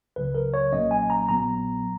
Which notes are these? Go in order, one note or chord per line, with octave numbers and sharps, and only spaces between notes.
C#2 C#3 F#3 B4
A#4
C#5
B1 A#2 F#3 A#3 C#4 D#5
G#5
A#5
A#1 A#2 F#3 B3 A#5